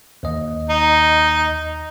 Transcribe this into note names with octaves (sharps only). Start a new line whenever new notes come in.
D#2 D#5
D#4